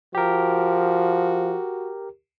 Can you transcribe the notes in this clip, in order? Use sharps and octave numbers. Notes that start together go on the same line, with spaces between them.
F3 F#4 G4 A#4